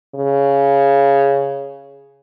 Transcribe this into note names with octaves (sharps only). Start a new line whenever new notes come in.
C#3